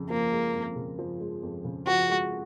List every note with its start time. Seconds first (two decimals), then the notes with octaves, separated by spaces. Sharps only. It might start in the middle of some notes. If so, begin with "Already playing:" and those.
Already playing: F2 C#3
0.10 F3 A#3
0.32 G#3
0.54 F2
0.76 C#3
0.99 F3
1.20 G#3
1.43 F2
1.65 C#3
1.87 F3 F#4
2.09 G#3